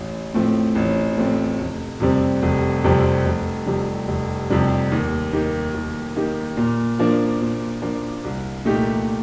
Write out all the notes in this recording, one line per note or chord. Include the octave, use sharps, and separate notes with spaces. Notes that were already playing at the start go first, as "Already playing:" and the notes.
Already playing: A1
A2 F3 A3 C4
A1
A2 F3 A3 C4
F1
F2 C3 G3 C4
F1
F2 C3 G3 C4
F1
F2 C3 G3
F1
F2 C3 G3
D#2
D#3 A#3 D#4 G4
D#2
D#3 A#3 D#4 G4
A#2
F3 A#3 D4
A#2
F3 A#3 D4
C2
A#2 A3 D#4 G4